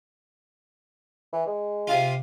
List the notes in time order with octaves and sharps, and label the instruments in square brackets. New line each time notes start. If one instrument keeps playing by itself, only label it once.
[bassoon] E3
G#3
[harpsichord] C3 F4